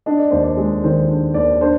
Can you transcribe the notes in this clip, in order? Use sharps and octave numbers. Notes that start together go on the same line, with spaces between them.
D4 D#5
D5
D#2 C5
D5
G#3
D#3 C5
D4
D#2 D5
D4 C5